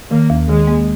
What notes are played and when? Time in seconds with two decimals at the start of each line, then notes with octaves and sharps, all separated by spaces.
0.11 D#3 A#3
0.30 D#2
0.49 D#3 G#3
0.68 A#3